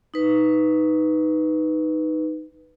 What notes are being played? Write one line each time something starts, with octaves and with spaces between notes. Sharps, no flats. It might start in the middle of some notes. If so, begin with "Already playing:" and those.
D#4 B4